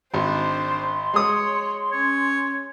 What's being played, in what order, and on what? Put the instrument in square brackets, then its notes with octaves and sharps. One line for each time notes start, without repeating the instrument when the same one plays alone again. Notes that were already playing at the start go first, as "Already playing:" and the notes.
[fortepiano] G#1 [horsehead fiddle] D4 C5 [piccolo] C6
[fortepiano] G#3 D#6 [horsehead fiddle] C#5
[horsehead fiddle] C#4 [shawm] C#5